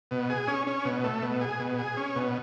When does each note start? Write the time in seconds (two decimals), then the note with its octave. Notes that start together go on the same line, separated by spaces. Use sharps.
0.11 B2
0.29 G#4
0.48 C#4
0.67 C#4
0.85 B2
1.04 A3
1.22 B2
1.41 G#4
1.60 B2
1.78 G#4
1.97 C#4
2.16 B2